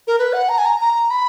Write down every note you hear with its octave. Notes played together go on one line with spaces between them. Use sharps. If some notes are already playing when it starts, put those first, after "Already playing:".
A#4
B4
F#5
A#5
G#5
A#5
A#5
B5